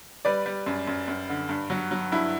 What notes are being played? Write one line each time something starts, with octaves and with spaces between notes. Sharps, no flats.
G3 B4 D5
G3
F#2
F#2
F#2
D3
G2
F#3
F#3
G2 E4